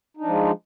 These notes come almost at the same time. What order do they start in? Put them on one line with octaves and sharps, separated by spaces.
D#4 D4 F3 G#3